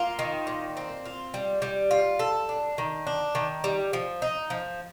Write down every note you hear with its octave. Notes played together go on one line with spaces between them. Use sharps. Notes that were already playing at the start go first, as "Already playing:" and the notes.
Already playing: A#3 F4
D#3
A#2
C4
F4
G3
G3
F4
A4
D4
D#3
D4
D#3
G3
F3
D#4
F3